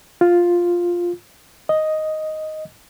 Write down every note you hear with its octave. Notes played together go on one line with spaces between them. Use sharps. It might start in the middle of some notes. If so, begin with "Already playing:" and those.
F4
D#5